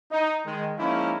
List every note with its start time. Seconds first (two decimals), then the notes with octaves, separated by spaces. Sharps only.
0.11 D#4
0.45 D#3 G#3
0.78 F3 G#3 A#3 C#4 D#4 E4